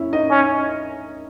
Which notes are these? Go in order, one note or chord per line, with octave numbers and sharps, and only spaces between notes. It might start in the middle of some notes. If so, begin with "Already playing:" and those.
Already playing: C#4 E4 E5
D#4 D#5
C#4